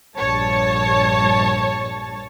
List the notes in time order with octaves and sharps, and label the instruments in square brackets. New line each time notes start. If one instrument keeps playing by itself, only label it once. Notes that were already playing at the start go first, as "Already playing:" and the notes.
[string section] A#1 G2 C#5 A5